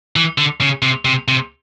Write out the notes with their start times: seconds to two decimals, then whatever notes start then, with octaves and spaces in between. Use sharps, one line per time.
0.16 E3
0.38 D3
0.61 C#3
0.82 C3
1.05 C3
1.28 C3